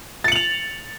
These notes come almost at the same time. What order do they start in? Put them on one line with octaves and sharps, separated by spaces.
A6 C#7 F#7 F7